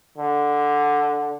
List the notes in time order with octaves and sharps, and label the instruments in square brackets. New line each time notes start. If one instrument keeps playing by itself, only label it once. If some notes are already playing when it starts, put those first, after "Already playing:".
[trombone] D3